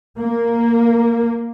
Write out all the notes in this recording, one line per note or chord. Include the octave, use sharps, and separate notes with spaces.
A#3